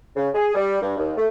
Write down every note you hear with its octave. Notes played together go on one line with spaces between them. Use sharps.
C#3
G#4
G3
G2
D#2
A3